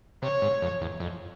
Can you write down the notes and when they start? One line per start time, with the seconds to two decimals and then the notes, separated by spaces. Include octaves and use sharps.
0.22 C3 C#5
0.42 G#2
0.62 F2
0.81 E2
1.00 F2